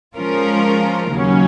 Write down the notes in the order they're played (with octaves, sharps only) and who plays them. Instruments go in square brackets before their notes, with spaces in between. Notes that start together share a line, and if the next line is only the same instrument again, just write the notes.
[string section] F3 G#3 C#4 F4 A#4
D#2 C#3 F#3 C#4